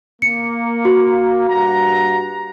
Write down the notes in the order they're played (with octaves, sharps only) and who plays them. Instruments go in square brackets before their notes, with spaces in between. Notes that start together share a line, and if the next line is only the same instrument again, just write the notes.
[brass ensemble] A#3 [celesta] C#7
[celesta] F#4
[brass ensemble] G2 F#5 A#5